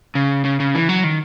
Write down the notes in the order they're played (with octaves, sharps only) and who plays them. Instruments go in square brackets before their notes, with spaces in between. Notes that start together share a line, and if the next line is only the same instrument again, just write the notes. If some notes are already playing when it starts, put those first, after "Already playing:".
[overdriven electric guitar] C#3
C#3
C#3
E3
F#3
D#3